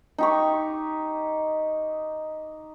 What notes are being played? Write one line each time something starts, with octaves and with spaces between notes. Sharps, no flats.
D#4 G4 C#6